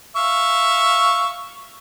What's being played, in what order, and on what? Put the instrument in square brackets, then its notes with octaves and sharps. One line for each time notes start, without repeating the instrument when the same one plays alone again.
[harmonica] E5 F5 C#6